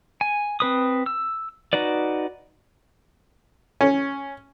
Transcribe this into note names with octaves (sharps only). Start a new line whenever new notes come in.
G#5
C4 B4 D#6
E6
D#4 F#4 B4 D5
C#4